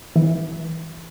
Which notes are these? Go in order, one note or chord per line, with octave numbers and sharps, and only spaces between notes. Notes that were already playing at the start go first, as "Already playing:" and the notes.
E3